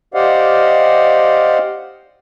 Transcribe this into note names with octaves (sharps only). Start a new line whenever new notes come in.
G4 C5 D5 D#5 F5 F#5